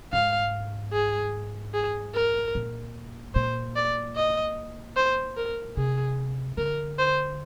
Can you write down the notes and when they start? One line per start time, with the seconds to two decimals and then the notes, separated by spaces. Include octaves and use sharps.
0.13 G#2 F5
0.93 G#4
1.74 G#4
2.14 A#4
2.55 A#2
3.35 A#2 C5
3.76 D5
4.16 D#5
4.96 C5
5.37 A#4
5.77 C3 G#4
6.58 D3 A#4
6.98 C5